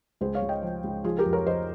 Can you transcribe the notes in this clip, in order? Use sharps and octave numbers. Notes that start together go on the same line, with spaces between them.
C#2 G#4 C5
C#5 F5
C#2
D#5 G5
F3
C#2
F3 F4 G#4
G4 A#4
F2
A#4 C#5
F3 C5 D#5